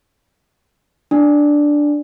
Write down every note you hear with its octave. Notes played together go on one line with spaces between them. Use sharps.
D4